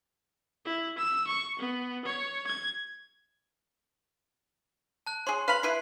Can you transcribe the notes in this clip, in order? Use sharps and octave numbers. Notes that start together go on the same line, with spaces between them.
E4
E6
C#6
B3
C#5
G#6
A5 F#6
G#4 C#5 C6
B4 F5 B5 F#6 F#7
E4 B4 C7